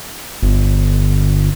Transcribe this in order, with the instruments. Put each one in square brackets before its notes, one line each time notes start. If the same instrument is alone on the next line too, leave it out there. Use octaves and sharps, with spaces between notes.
[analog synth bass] G1